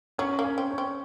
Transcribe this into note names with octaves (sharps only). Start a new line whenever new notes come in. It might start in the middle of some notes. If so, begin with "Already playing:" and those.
F#3 C#4
A#3
C#4
C4
C#4
C4